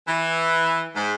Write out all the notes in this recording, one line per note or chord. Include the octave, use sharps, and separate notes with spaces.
E3
G#2